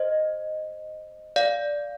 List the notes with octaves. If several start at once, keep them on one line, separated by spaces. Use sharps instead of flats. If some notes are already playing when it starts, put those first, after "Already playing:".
Already playing: C5 D#5
D5 F5